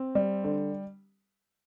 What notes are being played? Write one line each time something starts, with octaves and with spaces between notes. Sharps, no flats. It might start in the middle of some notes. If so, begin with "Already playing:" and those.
Already playing: C4
G3
D3